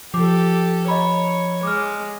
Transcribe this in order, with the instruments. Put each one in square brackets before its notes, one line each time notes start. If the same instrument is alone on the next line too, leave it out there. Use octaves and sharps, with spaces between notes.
[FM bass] F3 [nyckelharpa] G4 A4 [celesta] D6
[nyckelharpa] C#5 [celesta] D#5 A#5 B5
[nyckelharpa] G#3 [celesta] D6 F6